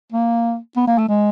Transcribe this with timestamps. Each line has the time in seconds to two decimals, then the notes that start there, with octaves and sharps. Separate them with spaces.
0.12 A#3
0.77 B3
0.88 A#3
0.98 A3
1.09 G#3